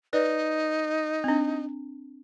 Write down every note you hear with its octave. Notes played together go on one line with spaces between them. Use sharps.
D#4 B4 D5
C4 D4